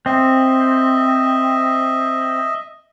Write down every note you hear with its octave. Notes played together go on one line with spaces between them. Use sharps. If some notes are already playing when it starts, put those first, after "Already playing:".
C4 D#5 E5